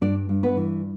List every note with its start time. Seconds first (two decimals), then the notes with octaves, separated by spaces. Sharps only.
0.01 G2 D4 D5
0.29 G2
0.43 B3 B4
0.57 E3